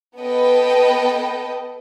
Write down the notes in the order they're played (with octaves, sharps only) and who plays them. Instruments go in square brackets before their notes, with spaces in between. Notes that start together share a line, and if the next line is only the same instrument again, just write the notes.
[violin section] B3 A4 B4 D#5 G5